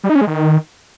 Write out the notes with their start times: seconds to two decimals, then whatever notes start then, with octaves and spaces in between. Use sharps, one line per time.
0.04 G3
0.10 D#4
0.15 C#4
0.21 G#3
0.27 D#3